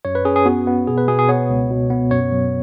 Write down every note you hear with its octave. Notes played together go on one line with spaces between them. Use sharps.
F#2 C#5
B4
C#4 G#4
G#4
B3 F#4
B3
B2 G#4
B4
B2 G#4
G#4
B3 C#5
C#2
B2
B3
F#2 C#5
F#3